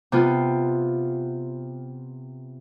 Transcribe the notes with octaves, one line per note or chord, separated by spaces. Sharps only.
C3 B3 F4